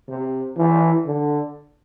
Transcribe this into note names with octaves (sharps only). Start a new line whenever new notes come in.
C3
E3
D3